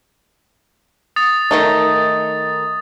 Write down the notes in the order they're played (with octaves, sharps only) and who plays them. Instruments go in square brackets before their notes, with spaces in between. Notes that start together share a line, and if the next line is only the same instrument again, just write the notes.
[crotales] D#6 A6
[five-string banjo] D#3 A3 D#4